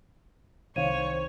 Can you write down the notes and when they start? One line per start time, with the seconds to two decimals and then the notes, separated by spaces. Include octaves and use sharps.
0.76 C2 D#3 C5 C#5 F5 D#7